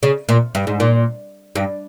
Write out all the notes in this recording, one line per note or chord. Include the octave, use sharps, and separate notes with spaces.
C#3
A#2
G2
G#2
A#2
G2